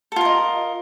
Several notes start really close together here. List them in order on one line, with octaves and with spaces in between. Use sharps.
A4 F4 A#4 D#5